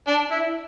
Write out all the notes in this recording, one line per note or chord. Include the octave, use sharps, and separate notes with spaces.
D4
E4